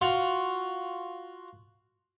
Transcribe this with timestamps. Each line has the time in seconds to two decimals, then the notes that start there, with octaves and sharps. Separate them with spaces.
0.01 F4 F#4